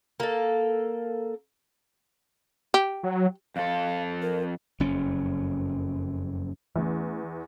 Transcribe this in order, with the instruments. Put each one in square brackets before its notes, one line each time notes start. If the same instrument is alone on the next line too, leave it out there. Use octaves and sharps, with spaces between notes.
[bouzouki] A#3 A4
[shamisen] G4
[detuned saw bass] F#3
[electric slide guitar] F2 A4 [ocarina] F5
[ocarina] A#4
[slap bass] F#1 F2 C#4
[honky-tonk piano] E2 [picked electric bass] E3 A3 C#4